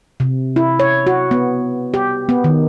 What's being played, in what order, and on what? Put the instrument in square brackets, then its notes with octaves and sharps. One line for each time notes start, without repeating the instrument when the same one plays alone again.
[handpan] C3
E4
C#5
F#4
B3
G4
B3
D#3